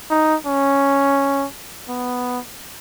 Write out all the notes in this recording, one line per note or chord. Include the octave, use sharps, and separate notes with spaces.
D#4
C#4
B3